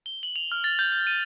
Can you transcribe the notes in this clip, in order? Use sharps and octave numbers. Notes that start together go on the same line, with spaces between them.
G7
F#7
F7
F6
A6
G6
G6
D#7